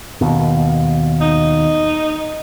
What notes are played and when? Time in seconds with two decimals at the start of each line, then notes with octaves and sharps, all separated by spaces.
0.21 D#2 B2
1.21 D#4